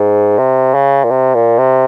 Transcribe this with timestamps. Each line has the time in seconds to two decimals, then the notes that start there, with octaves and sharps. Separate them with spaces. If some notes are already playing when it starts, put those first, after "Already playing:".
Already playing: G#2
0.38 C3
0.74 C#3
1.04 A#2
1.11 C3
1.35 A#2
1.59 C3